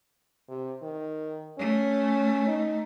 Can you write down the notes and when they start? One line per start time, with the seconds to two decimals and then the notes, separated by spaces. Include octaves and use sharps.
0.49 C3
0.83 D#3
1.59 A3 C#4
2.48 D#4